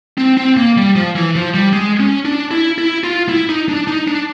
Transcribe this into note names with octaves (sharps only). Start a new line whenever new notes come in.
C4
C4
A#3
G3
F3
E3
F3
G3
G#3
C#4
D4
E4
E4
F4
E4
D#4
D4
D#4
D4